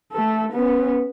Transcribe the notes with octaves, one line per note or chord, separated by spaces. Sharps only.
A3 A4
B3 C#4